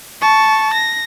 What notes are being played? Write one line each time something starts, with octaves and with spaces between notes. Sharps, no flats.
A5 C#6
A#6